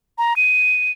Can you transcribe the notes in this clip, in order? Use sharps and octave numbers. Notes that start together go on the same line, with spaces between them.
A#5
D#7